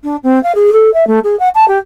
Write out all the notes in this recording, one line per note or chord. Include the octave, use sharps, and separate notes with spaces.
D4
C4
F5
G#4
A4
E5
A3
G#4
F#5
A5
G4